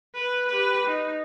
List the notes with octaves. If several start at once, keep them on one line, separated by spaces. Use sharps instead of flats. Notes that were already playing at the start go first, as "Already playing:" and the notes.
B4
G4 B4
D#4